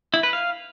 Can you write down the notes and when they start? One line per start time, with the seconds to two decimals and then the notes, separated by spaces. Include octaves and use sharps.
0.14 E4
0.23 B4
0.33 F5